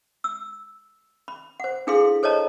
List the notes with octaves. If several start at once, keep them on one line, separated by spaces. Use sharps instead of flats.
E6
B5
C5 F#5
D4 E4 G#4 A4 F5 C6
A4 C5 C#5 D#5 A5 A#5